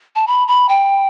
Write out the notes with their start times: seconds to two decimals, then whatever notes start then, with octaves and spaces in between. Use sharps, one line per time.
0.15 A5
0.27 B5
0.48 B5
0.69 G5